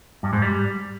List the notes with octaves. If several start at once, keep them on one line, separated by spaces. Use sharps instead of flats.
G2
G#2
G3